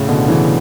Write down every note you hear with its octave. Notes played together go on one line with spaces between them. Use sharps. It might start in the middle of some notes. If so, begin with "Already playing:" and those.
Already playing: A2 C#3
B2 D3
C#3 E3